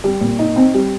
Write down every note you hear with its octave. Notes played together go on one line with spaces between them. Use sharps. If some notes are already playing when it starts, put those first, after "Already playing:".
G3
A#2
D#4
C4
G3